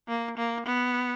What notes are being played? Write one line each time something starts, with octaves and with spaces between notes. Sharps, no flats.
A#3
A#3
B3